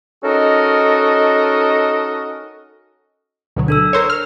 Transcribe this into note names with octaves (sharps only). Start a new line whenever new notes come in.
C#4 D#4 F#4 A4 A#4 D#5
D2 B2 F#3
D4 A4 E6
A#4 C5 C#5
F6